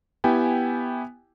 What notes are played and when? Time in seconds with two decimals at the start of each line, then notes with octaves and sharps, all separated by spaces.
0.24 B3 E4 G4 G5 G#5